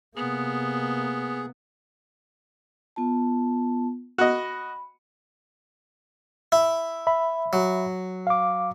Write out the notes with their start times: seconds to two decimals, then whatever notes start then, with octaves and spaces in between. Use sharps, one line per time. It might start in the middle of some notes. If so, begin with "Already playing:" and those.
0.16 C3 A#3 B3 G#4
2.96 B3 F4 A5
4.18 F#4 D#5 B5
6.52 E4
7.07 E5 B5
7.53 F#3
8.27 F5 D6